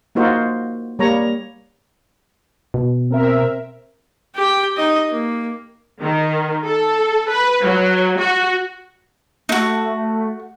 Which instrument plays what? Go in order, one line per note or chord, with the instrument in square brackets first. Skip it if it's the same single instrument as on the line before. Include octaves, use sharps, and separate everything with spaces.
[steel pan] A#3 D#4 F4 F#4 C5
G3 A#3 C#5 A#5
[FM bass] B2
[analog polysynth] C4 A#4 E5
[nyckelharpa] G4 G5
D#4 D#5
A#3
[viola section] D#3
A4
B4
F#3
F#4
[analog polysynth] A3 [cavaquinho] D#4 F#4